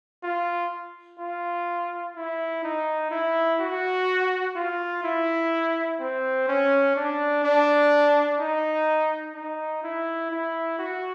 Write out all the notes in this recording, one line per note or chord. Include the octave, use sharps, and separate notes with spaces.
F4
F4
E4
D#4
E4
F#4
F4
E4
C4
C#4
D4
D4
D#4
D#4
E4
E4
F#4